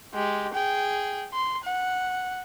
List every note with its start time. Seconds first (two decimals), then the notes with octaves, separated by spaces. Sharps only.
0.14 G#3 G4
0.53 G#4 G5
1.33 C6
1.64 F#5